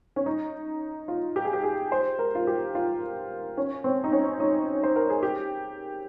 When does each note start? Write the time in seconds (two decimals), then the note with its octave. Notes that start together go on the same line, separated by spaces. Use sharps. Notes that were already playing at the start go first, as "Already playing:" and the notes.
0.16 C#4
0.26 D#4
1.08 F4
1.36 G4
1.45 G#4
1.53 G4
1.64 G#4
1.92 C5
2.19 A#4
2.35 F4
2.47 G4
2.75 F4
3.57 C#4
3.84 C4
4.04 D#4
4.12 C#4
4.40 D#4
4.83 C5
4.96 A#4
5.10 G#4
5.23 G4